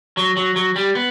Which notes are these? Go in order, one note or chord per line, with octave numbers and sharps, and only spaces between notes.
F#3
F#3
F#3
G3
B3